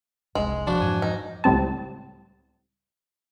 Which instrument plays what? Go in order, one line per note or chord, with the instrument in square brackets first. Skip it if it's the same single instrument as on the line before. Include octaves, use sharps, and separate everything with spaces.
[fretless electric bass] F1 C2 [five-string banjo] G#3
[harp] F3 F#4 [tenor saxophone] D4
[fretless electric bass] F2 G#2 E3 [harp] G#5
[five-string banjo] D#4
[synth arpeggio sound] C#2 A2 G3 C4 A5